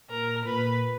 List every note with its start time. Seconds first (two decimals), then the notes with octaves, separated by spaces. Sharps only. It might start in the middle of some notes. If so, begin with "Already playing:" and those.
0.10 A#2 A#4
0.45 A#2 B4